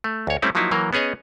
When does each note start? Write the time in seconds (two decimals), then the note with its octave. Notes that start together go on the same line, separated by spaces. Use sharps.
0.04 A3
0.27 D2 C#5
0.42 G3 A3 C4 C#4 E4
0.55 F3 F#3 A#3 D#4 E4
0.71 E3 F#3 A#3 A#4
0.93 B3 C#4 G#4 C#5 D#5